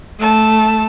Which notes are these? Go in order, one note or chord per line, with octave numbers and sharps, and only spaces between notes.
A3 A5